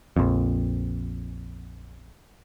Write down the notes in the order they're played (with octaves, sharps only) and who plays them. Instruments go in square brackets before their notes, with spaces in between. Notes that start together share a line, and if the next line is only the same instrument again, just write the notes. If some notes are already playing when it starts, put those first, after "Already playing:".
[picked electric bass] A#1 F2